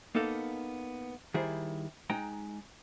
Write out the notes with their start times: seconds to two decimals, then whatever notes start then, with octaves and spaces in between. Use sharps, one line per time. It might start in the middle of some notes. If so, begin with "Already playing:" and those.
0.15 A#3 B3 D#4 A4 F5
1.34 D#3 G3 E4 G#4 C5
2.10 G#3 D#4 G5 A#5